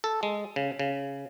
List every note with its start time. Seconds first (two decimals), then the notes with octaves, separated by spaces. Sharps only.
0.04 A4
0.23 G#3
0.56 C#3
0.80 C#3